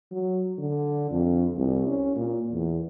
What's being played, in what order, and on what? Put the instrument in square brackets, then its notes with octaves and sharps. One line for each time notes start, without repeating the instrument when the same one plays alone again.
[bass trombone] F#3
D3
F2
C2
C#4
A#2
E2